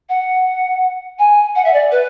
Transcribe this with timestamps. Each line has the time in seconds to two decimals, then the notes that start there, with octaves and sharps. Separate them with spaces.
0.09 F#5
1.19 G#5
1.56 F#5
1.65 E5
1.73 D5
1.92 B4